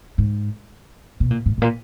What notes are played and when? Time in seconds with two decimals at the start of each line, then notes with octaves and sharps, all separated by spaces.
0.18 G#2
1.20 B2
1.31 A#2
1.46 G#2
1.58 G#2
1.62 A#2